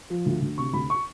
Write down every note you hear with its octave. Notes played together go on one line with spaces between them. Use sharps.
F3
D2
D2
C3 C#6
D2 B5
C#6